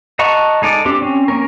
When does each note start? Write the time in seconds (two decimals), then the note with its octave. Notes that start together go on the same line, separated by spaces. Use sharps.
0.19 D#5 F#5 A5 A#5 C#6
0.62 G#3 D#4 A4 D5
0.85 C4 D4 G4
1.02 C4 C#4
1.28 A#3 C#4 A#4